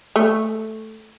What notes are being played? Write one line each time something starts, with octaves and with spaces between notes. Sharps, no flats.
A3